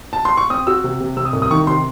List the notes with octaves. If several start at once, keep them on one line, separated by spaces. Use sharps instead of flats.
A5
C6
C#6
C4 D#6
F#4 E6
C3
C3
C3 E6
D#6
C2
D#6
D#3 C#6
C3 C6